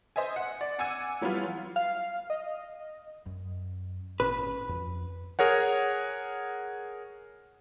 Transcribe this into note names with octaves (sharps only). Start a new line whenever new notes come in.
C5 D#5 E5 G#5
F#5
D5
F#5 G#5 D6 E6 G#6 D#7
E3 F#3 G3 B3 F4
F5
D#5
F#2
G#1 A#2 C#4 B4
F2
G#4 A#4 C#5 F#5